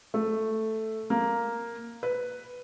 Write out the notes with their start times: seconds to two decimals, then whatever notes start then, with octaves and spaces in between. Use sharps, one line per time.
0.14 A3
1.10 A#3
2.03 B4